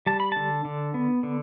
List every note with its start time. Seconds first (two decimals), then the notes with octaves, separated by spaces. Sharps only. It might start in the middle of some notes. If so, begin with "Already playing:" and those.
0.06 G3 A5
0.20 B5
0.32 D3 A5
0.65 D3
0.94 B3
1.23 D3